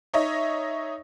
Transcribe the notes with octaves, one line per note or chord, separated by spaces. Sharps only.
D#4 C#5 D#5 E5